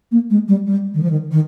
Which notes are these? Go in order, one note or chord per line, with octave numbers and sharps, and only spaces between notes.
A#3
G#3
G3
G3
D#3
F3
D#3
D#3